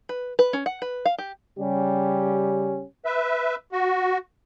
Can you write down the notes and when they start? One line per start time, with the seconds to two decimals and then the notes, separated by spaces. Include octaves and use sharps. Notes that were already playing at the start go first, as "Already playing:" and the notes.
0.09 B4
0.39 B4
0.53 C#4
0.66 F#5
0.82 B4
1.05 F5
1.18 G4
1.59 C#3 G3 C#4 G4
3.05 B4 E5
3.72 F#4